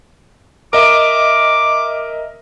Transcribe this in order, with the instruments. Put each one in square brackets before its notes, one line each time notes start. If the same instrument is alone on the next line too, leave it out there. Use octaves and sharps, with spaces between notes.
[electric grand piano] A#4 D#5 E5 [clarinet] D6